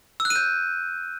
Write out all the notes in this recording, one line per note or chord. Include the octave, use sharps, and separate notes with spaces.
E6
F#6
D#7
G6